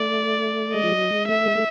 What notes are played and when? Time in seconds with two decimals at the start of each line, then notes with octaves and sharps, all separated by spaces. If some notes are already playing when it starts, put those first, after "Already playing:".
Already playing: A3 D5
0.74 G#3 D#5
0.84 F3
0.92 F#3
1.10 G#3
1.28 A3 E5
1.46 G#3
1.55 A3